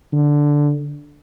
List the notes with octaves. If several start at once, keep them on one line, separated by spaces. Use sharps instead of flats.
D3